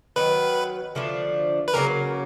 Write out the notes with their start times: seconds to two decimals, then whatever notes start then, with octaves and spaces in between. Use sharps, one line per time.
0.16 D#3 F#3 B3 B4
0.95 D3 F3 A3 D4
1.68 B4
1.74 C#3 F#3 A#3 C#4 A#4